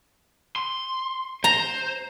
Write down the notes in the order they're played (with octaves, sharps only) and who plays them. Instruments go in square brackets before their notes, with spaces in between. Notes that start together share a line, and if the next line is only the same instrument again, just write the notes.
[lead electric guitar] C6
[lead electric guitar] C5 [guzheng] A#5